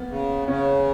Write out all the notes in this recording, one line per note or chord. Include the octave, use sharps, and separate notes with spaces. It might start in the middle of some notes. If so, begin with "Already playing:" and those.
Already playing: A#3 B3
C#3
C#3 C#4